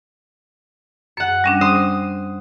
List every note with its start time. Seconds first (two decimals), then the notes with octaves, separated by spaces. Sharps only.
1.17 F#2 F#5 C#7
1.44 G3 C#4 D4
1.61 C5 D#6